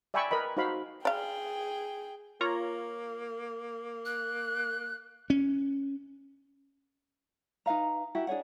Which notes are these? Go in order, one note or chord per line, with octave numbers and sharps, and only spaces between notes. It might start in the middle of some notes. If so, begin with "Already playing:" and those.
D5 E5 G5 G#5 B5 C#6
A#4 B4 D#5 B5
D#4 F#4 C5 F5 B5
G#4 D5 F5 G5
A#3 F4 C#5 A#5
F#6
C#4
D#4 B4 F5 A#5
E4 F#4 G4
D4 G#4 C#5 F#5